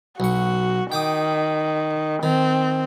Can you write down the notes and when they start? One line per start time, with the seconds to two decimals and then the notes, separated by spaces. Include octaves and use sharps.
0.20 B1 F#4 C#6
0.92 D#3 G5 D6 D#6
2.23 D#3 C4